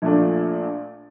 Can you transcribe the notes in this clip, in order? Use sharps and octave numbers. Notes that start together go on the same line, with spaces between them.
A#1 A#2 A3 D4